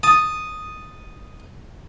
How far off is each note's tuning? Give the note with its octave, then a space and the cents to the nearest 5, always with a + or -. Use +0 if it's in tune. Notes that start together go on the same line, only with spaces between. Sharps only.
A5 +0 D#6 +0